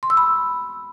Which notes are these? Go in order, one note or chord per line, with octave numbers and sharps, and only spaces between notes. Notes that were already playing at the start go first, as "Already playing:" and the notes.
C6
E6
B5